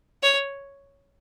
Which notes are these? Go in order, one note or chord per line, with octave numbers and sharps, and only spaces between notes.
C#5